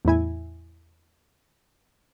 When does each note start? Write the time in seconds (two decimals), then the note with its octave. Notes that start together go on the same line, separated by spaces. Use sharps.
0.05 E2 A2 E4 G#5